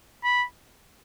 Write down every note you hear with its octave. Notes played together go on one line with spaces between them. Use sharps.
B5